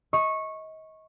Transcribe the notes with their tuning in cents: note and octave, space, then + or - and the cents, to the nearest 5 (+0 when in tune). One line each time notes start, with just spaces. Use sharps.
D#5 +30 C#6 -15